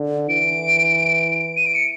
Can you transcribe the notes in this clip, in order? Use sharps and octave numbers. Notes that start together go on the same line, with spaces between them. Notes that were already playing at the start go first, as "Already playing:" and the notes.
Already playing: D3
E3 D7
D#7
D7
C#7